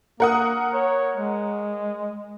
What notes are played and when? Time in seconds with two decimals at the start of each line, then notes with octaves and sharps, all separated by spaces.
0.20 A#3 A#4 F#5 D#6
0.74 C#5
1.16 G#3